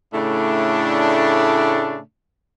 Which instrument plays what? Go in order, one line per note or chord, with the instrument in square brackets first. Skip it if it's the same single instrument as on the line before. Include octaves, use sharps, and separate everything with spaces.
[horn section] A2 C#3 A3 D4